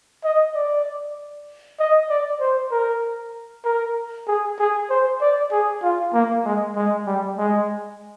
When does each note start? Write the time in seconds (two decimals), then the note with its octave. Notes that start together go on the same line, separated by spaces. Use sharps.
0.25 D#5
0.55 D5
1.80 D#5
2.10 D5
2.41 C5
2.72 A#4
3.65 A#4
4.28 G#4
4.59 G#4
4.90 C5
5.21 D5
5.52 G#4
5.83 F4
6.13 A#3
6.45 G#3
6.76 G#3
7.06 G3
7.38 G#3